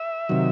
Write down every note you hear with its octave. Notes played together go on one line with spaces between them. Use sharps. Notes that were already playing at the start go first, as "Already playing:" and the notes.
Already playing: E5
C3 D#3 F#3